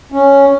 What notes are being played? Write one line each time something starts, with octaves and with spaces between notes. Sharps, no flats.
C#4